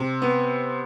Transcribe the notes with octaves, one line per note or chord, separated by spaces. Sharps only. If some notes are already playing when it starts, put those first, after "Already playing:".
Already playing: C3
B3